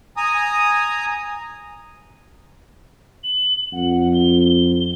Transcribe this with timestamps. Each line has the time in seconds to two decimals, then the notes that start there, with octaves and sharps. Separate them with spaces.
0.17 G#5 A#5 D#6
3.23 F#7
3.72 F2 F#5
4.14 G7